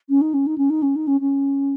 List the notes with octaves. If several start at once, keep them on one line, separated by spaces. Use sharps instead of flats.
C#4
D#4
C#4
D#4
C#4
D#4
C#4
D#4
C#4
C#4